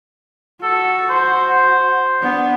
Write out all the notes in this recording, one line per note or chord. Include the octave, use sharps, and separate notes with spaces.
F#4 A4
C5
B3 D4